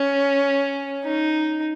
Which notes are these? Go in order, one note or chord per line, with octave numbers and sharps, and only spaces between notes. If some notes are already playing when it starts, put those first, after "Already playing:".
Already playing: C#4
D#4